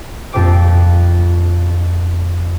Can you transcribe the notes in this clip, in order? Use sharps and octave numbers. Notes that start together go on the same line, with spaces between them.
F2 A#2 A4 C5 G5 D6